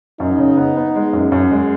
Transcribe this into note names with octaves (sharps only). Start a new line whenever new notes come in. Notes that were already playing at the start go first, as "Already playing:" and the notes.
F#2 D#4
C#3
B3
B3
G#3
F#2
F#2
G#3